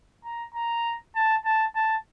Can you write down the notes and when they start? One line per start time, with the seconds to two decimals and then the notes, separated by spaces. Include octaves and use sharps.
0.25 A#5
0.55 A#5
1.15 A5
1.45 A5
1.75 A5